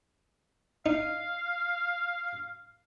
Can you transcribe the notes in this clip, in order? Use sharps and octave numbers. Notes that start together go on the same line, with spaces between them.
D#4 F5